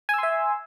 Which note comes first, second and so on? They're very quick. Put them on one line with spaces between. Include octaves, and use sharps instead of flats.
G#5 E6 C6 E5